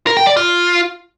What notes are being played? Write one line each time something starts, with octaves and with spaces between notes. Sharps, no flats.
A#4
G5
D5
F4